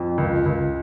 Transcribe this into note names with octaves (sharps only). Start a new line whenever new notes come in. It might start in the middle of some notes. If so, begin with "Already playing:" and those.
Already playing: F2
C#2
C#2